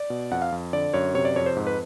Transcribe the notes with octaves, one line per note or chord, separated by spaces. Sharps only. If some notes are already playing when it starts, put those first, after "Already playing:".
Already playing: D5
B2
F2 F#5
F5
F2
D3 D5
F#2 C#5
C3 C#5
D5
F2 C#5
C5
G#2
B4